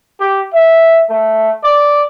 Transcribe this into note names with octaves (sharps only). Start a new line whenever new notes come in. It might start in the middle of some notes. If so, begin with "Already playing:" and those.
G4
E5
A3
D5